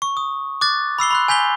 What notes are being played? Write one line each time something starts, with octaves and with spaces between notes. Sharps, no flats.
C#6
D#6
D6 F#6 A6
B5 E6 C7 G7
B5 C6 F#6
G#5 G6 B6 F7 G7